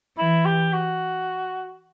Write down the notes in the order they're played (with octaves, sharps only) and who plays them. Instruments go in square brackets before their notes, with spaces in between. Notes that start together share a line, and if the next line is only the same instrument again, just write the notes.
[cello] E3 [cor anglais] E4
[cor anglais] G4
F#4